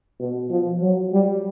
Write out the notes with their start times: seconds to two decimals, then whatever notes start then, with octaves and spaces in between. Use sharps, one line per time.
0.20 B2
0.51 F3
0.81 F#3
1.13 G3